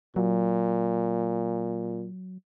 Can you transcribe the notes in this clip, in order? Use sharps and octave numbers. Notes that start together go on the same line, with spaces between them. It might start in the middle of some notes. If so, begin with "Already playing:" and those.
A#2 F#3